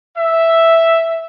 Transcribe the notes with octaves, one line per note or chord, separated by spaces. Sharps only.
E5